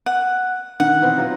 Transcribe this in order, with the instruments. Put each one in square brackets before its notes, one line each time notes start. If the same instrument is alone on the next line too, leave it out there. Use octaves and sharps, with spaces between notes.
[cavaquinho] F#5
[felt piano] D#3 [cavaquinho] F#5
[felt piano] E3 B3 C4
F#3 F4